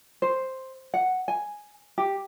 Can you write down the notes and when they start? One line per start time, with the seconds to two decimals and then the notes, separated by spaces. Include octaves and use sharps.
0.22 C5
0.94 F#5
1.28 G#5
1.98 G4